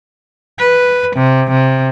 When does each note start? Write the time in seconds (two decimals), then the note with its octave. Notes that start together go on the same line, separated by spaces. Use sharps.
0.59 B4
1.16 C3
1.51 C3